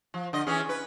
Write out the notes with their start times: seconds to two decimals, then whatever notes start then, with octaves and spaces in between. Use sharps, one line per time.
0.14 F3
0.33 D3 D#5
0.47 E3 C#4 G#4
0.69 B4